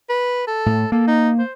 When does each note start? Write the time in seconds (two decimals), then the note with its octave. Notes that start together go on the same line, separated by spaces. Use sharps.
0.09 B4
0.47 A4
0.66 A2
0.92 A#3 A4
1.07 D#4
1.39 C5